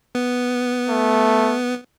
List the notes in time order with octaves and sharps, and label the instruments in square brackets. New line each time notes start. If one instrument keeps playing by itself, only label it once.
[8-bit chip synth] B3
[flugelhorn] A3